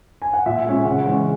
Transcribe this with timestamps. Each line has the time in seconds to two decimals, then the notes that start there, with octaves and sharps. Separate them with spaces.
0.22 G#5
0.33 F#5
0.46 A#2 E5
0.66 G#3 C#4
0.85 C#3 F#5
1.06 E3 G#3 C#4